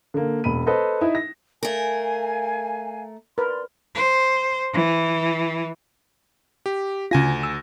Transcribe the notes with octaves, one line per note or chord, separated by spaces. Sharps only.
D3 A#3
E1 B5 D#7
A4 B4 C5 D#5
D#4 E4 E5
A#6
A3 A#4 F5 G#5
A#4 B4 D5 C6
C5
E3
G4
D2 C#3 F4 G#5 A#6
E6